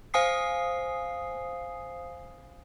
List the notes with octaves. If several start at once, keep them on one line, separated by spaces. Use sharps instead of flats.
C5 F5 G#5 D#6 C7